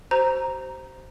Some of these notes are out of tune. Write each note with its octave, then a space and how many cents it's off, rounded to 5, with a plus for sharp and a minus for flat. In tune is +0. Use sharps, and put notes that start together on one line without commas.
G4 -45 C5 +0 A#5 +0